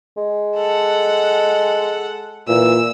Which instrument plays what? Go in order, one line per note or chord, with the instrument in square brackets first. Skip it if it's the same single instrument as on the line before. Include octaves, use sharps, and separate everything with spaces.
[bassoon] G#3
[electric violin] A4 F#5
[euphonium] A#2 [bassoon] E3 [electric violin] E6